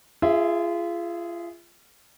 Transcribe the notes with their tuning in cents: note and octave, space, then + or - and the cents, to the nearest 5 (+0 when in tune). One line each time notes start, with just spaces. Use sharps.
F4 -30 G#4 +0 E5 +0